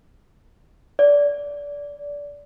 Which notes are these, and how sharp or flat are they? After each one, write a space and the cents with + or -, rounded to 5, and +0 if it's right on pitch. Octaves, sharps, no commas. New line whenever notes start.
D5 -20